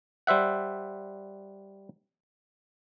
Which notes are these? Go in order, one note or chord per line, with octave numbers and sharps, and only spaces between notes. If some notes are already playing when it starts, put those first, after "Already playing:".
G3 C5 E5 F#5